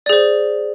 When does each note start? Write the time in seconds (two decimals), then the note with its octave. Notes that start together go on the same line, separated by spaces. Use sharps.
0.06 D5
0.09 G#4
0.13 C5